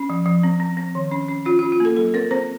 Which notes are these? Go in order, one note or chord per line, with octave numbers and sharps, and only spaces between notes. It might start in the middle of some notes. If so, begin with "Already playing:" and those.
Already playing: C#4
F3
F3
C4
C4
C4
D#3
C#4
C#4
C#4 F4
C#4 F4
F4
A#3 A4
F#3 A4
C4 A#4
C4 C5